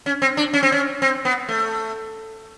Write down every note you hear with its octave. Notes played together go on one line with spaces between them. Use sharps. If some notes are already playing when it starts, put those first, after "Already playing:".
C#4
C4
D4
C#4
C4
C#4
C4
B3
A3